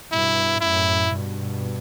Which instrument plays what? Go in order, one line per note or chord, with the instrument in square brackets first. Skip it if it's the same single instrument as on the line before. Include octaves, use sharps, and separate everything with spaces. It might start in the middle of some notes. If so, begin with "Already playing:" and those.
[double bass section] G2 B2 [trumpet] E4
[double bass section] F#2 A2 [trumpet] E4
[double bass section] G2 B2